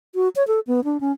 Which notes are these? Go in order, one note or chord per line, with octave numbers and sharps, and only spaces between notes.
F#4
C#5
A4
B3
D4
C#4